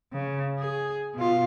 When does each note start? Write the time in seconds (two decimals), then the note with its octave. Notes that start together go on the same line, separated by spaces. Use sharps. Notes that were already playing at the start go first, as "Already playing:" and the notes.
0.13 C#3
0.59 G#4
1.15 B2 F4